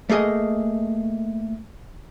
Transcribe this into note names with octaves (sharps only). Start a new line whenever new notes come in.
A3 A#3 G#4 D#5